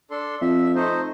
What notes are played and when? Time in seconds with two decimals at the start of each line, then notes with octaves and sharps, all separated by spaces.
0.11 D4 A4 C6
0.41 F2 E5
0.76 A3 D#4 C5